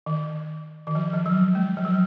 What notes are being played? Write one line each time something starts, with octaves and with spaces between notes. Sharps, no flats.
D#3
D#3
F3
F3
F#3
G#3
F3
F#3